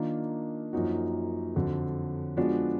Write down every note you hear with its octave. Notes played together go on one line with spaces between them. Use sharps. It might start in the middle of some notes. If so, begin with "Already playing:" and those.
Already playing: D#3 A#3 D4 F4
F#2 F3 A#3 D#4 F#4
F2 D3 F#3
F3 G#3 B3 D4 F#4